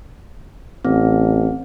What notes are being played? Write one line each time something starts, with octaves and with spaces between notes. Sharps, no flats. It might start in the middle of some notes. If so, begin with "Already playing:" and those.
A1 C4